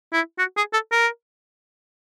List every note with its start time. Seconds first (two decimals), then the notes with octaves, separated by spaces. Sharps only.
0.13 E4
0.39 F#4
0.57 G#4
0.73 A4
0.92 A#4